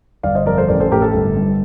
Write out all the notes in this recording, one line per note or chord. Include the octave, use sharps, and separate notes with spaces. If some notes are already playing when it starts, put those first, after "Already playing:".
G1 D5 F5
C5 D#5
F2 A#4 D5
A4 C5
A1 A#4 D5
A4 C5
A2 G4 A#4
A4
G1
G2